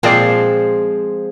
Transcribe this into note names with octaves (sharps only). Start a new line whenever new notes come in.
A#2 F3 G#3 C4 D5 C7